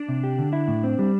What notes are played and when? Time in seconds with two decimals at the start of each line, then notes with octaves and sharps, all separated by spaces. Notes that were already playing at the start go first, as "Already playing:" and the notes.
Already playing: D4
0.09 C3
0.24 G4
0.39 D3
0.53 E4
0.68 A2
0.84 C4
0.99 G3